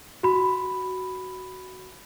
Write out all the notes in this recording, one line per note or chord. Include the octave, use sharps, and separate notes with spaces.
F#4 B5